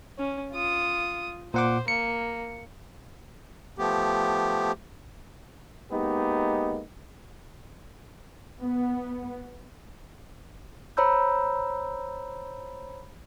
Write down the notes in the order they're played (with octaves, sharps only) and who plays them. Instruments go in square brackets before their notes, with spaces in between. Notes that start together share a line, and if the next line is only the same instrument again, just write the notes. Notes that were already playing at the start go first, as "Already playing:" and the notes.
[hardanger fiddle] C#4
F4 D#6
[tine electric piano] A#2 F#5 D6 [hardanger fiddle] C5
[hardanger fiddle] A#3 [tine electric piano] C#7
[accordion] F3 A3 B3 G4
[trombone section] G#3 A#3 B3 D#4 G4
[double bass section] B3
[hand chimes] C5 C#5 A#5 B5 E6 G6